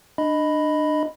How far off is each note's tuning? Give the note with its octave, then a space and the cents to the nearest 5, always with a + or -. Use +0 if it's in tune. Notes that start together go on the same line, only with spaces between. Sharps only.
D4 +25 D#5 +0 B5 +0